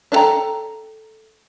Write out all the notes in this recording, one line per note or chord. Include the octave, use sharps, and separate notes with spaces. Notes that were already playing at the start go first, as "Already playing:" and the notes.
D4 A4 G5 A#5